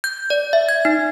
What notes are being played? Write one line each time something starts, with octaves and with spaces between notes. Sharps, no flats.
G6
D5
E5
G#6
D#4